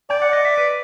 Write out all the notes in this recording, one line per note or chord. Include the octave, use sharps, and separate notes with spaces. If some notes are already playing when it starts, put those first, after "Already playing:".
D5 G5
F#5
D#5
E5
B4